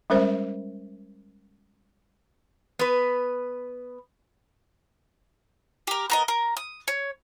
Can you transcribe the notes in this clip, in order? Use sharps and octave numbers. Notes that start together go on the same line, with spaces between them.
G3 G#3 C#4 A#4 C5 E5
B3 B4
G4 A#4
B3 A#4 D#5
A#4
D#6
C#5